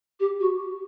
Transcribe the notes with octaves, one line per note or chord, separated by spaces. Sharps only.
G4
F#4